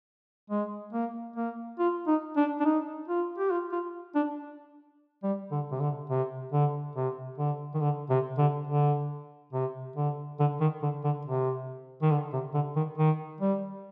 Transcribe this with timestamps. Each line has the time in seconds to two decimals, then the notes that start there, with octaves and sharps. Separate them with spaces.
0.50 G#3
0.93 A#3
1.36 A#3
1.79 F4
2.07 D#4
2.36 D4
2.60 D4
2.65 D#4
3.08 F4
3.38 G4
3.51 F4
3.72 F4
4.15 D4
5.23 G3
5.51 D3
5.72 C3
5.80 D3
6.10 C3
6.52 D3
6.96 C3
7.38 D3
7.74 D#3
7.81 D3
8.10 C3
8.38 D3
8.67 D3
9.53 C3
9.96 D3
10.39 D3
10.61 D#3
10.82 D3
11.04 D3
11.25 C3
12.02 D#3
12.11 D3
12.33 C3
12.54 D3
12.76 D#3
12.98 D#3
13.41 G3